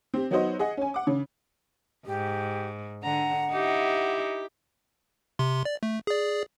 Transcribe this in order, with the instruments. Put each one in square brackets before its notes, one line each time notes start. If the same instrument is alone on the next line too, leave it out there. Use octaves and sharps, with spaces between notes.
[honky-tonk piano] C4 G4
F#3 B3 D#4 F#4 C5 D#5
G#4 D#5 F#5
C#4 G#5
F#5 D6
C#3
[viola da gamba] G#2 [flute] G4
[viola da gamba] D3 [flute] F#5 [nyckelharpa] A#5
[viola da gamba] D#4 E4 [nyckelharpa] G4
[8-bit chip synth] C3 C6
D5
A3
G#4 D5